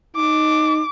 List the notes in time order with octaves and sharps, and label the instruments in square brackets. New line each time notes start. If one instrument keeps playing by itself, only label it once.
[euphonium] D#4 [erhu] D6